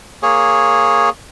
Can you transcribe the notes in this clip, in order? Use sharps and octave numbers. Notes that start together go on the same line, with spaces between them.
A#3 G#4 C#5